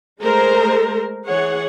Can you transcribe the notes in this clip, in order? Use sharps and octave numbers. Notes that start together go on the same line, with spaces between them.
G#3 A3 G#4 A#4 C5 A#5
E3 G#4 C#5 F#5